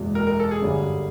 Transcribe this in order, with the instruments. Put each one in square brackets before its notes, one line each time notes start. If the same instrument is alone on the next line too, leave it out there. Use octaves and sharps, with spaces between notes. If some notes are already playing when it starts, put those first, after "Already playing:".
Already playing: [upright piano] F#1 E2 B2 G#3
[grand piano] A#4
A#4
A4
G#4
[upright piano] G1 F#2 D3 G3